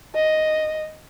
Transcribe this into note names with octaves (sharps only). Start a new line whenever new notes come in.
D#5